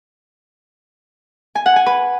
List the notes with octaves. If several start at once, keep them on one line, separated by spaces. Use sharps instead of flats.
G#5
F#5
G#5
B4